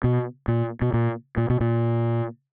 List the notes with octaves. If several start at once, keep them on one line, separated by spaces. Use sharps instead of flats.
B2
A#2
B2
A#2
A#2
B2
A#2